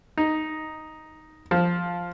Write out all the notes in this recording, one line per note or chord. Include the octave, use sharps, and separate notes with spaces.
D#4
F3